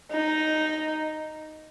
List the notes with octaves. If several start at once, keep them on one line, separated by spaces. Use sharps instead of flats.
D#4